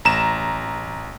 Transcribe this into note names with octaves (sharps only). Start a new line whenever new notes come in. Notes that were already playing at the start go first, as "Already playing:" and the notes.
A1 A#5 E7